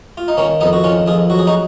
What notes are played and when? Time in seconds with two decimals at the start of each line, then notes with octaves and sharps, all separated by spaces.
0.17 F4
0.28 D#4
0.37 D#3 A#3 C#4
0.61 F2 B3 D#4
0.73 F#4
0.83 D#3 C#4 F4
1.06 F2 F4 G#4
1.30 F#3 F#4
1.39 G#4
1.47 D#4 F#4